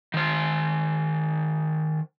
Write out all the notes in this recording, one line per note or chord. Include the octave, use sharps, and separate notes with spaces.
D#3 C5